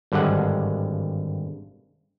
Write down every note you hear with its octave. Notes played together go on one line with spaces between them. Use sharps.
G#1 G2 D3 G#3 F#5